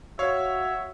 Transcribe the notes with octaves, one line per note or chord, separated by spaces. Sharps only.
F#4 C#5 E5 F5